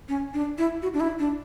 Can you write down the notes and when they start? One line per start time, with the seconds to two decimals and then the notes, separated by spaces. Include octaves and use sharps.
0.09 C#4
0.34 D4
0.58 E4
0.82 F#4
0.94 D4
1.00 E4
1.19 D4